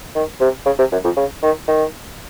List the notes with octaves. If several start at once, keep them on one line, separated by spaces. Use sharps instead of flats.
D#3
C3
C#3
C3
F#2
F2
C#3
D#3
D#3